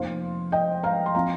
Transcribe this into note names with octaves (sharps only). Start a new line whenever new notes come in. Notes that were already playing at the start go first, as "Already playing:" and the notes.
Already playing: F1 F2 F3 A#3 D#4 C5 F5
D#5 G5
F5 A#5
C6
F3 C4 F5 A#5